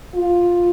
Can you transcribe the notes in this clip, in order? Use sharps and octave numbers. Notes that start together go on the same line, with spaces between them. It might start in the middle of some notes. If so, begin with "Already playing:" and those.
F4